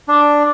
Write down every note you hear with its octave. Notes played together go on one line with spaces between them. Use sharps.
D4